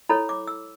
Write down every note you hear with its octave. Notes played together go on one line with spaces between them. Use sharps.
E4 A4 C#5 B5
D6
E6